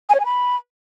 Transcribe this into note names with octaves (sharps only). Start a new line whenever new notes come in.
G#5
C#5
G#5
B5